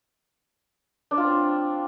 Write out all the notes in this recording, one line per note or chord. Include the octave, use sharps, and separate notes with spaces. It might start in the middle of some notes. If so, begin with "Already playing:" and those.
D4
F4
C4